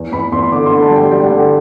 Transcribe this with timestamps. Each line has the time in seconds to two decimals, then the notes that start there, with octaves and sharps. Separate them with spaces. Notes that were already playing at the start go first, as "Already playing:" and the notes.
Already playing: E2
0.12 E2 B5
0.32 E2 C6
0.43 C6
0.52 D3 D6
0.66 C6
0.71 D3
0.81 A5
0.90 G3
0.96 G5
1.11 G3 G5
1.22 F#5
1.30 D3 G5